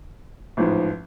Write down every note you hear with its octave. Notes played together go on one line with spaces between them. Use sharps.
A1 G#2 F3